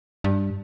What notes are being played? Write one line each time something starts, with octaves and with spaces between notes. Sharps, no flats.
G2